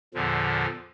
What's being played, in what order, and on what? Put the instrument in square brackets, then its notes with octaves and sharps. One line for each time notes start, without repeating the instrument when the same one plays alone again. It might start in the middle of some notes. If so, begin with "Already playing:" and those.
[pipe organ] E2 A#2 D3 F3